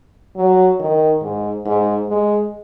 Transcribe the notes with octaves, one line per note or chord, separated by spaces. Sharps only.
F#3
D#3
G#2
G#2
G#3